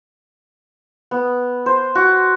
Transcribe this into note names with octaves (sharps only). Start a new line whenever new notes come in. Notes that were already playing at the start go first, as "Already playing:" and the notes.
B3
C5
F#4